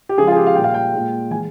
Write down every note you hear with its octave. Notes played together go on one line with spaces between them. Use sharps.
G4
C#3 F3 G#3 G#4
F4
G#4
G4
F5
A#2 G3 A#3 G5
F5
G5
A#2 G#3
E3 G#3 G#5